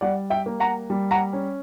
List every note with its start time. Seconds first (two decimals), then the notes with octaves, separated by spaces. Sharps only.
0.01 G3 D5 F#5
0.30 E5 G5
0.46 A#3
0.60 F#5 A#5
0.90 G3
1.11 F#5 A#5
1.33 C#4